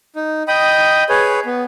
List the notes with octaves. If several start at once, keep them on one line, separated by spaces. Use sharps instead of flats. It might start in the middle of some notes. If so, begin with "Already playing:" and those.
D#4
D#5 G5 B5 D#6
G#4 B4 C#5
B3